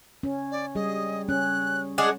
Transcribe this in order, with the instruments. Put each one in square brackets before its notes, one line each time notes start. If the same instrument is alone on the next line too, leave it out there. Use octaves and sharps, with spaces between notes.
[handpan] C#4
[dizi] D5
[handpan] G3 G#4 [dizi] D#5
[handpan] C#4 [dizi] F#6
[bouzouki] G#3 D4 G#4 [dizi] F#5